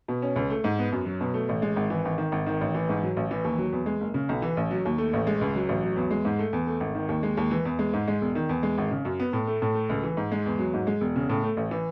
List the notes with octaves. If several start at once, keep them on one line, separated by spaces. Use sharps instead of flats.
B2
C#4
C#2
A3
G#2
B3
F#2
F#3
B2
A3
A1
G#3
G#1
E3
G#1
D#3
G#1
D#3
A1
E3
G#2
F#3
A1
E3
D#2
F#3
E2
G#3
F#1
C#3
B1
E3
A1
F#3
D#2
A3
A1
G#3
C#2
F#3
A1
F#3
E2
G#3
G#2
A3
E2
A3
G#1
D#3
D#2
G#3
D#2
E3
E2
G#3
G#2
G#3
E1
D#3
E2
G#3
G#1
C#3
F#2
B3
A2
A3
A2
A3
C#2
E3
G#2
G#3
E2
F#3
G#2
G#3
E1
C#3
A2
A3
A1
E3